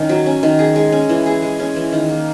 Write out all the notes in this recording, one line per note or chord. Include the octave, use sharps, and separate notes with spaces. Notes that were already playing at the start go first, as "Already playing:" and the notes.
Already playing: D#3 C#4
F#3
C#4
D#3
G#4
G#3
C#4
E3
G#4
G#3
C#4
E3
D#3
A#3